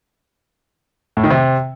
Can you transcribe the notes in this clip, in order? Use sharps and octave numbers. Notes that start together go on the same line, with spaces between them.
A2
D#3
C3